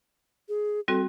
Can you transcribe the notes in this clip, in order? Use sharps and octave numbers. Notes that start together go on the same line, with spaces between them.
G#4
G3 C4 F#4 A4